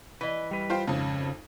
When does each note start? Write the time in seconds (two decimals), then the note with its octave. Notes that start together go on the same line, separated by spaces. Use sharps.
0.21 E3 B4 D#5
0.51 G3 B4
0.70 F4 C5 G5
0.87 G#1 F2 C#3